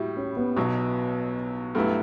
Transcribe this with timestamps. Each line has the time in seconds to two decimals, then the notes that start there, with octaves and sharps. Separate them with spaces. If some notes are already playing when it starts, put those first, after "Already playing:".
Already playing: A2 G3 E4 F#4 G4
0.17 C#4
0.37 B3
0.57 B1 B2 F#3
1.75 G2 F#3 A3 B3 E4